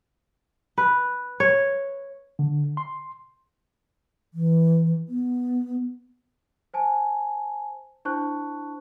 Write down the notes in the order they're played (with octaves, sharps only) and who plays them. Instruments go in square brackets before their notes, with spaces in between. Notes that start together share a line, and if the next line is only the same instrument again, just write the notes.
[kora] B4
C#5
[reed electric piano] D3
C6
[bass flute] E3
B3
[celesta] C5 G#5 A5
D4 E4 C5 A5 C#6 F#6